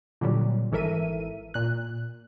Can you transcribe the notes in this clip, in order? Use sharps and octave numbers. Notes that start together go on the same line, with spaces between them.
A#2 D3 F#3 G3
G#1 E3 A4 A#4 E5 D#7
A#2 F#6